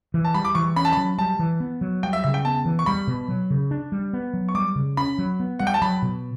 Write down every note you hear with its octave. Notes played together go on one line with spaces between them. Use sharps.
E3
A5
G3 B5
D6
E3 C#6
C#4 B5
A5
B5
F#3
G3 A5
E3
B3
F#3
G3 G5
E5
C#3 E5
G5
B3 A5
E3
C#6
G3 B5
B2
F#3
C#3
D4
G3
B3
F#3
C#6
G3 D6
C#3
C#4 B5
F#3
B3
G3 F#5
G5
A5
F#3 B5
B2